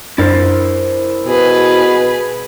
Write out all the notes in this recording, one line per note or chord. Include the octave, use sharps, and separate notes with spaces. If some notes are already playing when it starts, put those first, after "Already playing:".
F#2 D4 E4 A#4 C5 A6
B2 G#4 B4